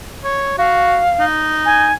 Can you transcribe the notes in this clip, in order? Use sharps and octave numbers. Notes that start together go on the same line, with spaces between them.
C#5
F#4 F5
D#4
G#5